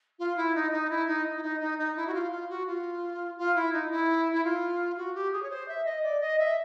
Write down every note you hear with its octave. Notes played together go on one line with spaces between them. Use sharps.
F4
E4
D#4
D#4
E4
D#4
E4
D#4
D#4
D#4
E4
F#4
F4
F4
F#4
F4
F4
E4
D#4
E4
E4
F4
F#4
G4
G#4
C#5
C5
E5
D#5
D5
D#5
E5